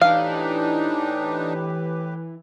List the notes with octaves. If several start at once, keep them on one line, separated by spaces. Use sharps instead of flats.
A2 E3 D4 D#4 G4 B4 F5